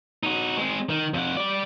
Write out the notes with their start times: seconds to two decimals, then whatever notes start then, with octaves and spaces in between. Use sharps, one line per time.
0.23 D#4 F#4
0.57 G#3 C4
0.89 D#3
1.14 F2 F#5
1.37 G3 D5